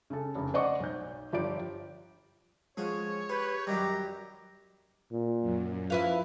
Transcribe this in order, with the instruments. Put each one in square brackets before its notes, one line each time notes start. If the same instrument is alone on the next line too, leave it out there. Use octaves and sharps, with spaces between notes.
[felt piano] C#3 A4
F1 C#3
C5 D5 D#5 F#5 C#6 D6
B1 G6
G1 F3 G4 D5 D7
[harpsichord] F3 C#4 F#4 [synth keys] G#3 G#4 [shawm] C#5
[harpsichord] G4 [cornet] B4 [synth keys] F#6 G6
[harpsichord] F#2 D#3 G3 [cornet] G4 [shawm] A#5
[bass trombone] A#2
[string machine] F#2
[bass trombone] F3 [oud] E4 B4 F5